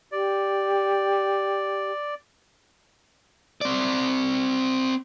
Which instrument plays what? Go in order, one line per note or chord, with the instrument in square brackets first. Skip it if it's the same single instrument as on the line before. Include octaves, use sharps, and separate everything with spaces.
[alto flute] G4 [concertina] D5
[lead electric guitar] C4 D5